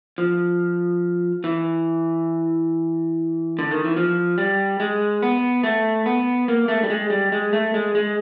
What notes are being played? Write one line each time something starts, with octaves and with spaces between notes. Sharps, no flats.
F3
E3
D3
D#3
E3
F3
G3
G#3
B3
A3
B3
A#3
A3
G3
G#3
G3
G#3
A3
G#3
G#3